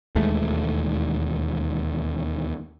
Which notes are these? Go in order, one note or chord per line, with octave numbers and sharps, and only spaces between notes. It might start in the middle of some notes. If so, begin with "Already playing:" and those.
E1 D#2 G#3 A3